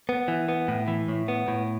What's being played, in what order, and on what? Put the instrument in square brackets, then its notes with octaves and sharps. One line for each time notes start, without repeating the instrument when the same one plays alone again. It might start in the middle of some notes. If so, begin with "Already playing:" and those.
[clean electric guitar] B3
E3
B3
A2
E3
A2
B3
A2